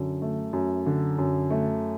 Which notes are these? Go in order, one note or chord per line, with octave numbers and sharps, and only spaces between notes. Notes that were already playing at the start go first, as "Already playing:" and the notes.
Already playing: F#2 D3
A3
F#2
D3
F#2
A3